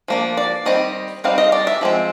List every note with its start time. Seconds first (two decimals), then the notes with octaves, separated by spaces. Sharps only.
0.08 F3 A#3 D4
0.37 D5
0.66 D#3 G3 C4 D#5
1.24 G3 C4 D#4 F5
1.38 D#5
1.52 D5
1.67 E5
1.81 F3 G#3 C4